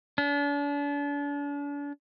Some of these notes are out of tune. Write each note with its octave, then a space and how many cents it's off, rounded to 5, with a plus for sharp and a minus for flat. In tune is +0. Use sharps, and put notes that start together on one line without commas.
D4 -40